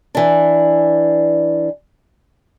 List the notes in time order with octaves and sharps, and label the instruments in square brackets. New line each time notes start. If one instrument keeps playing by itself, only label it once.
[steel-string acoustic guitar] E3 D4